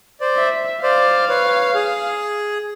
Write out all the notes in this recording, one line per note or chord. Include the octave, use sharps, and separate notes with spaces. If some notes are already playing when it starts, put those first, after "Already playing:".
C5 D5
E5
C5 D5 F5
B4 C#5
G#4